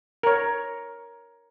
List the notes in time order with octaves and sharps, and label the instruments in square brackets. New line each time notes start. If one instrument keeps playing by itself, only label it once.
[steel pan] A#4 C#5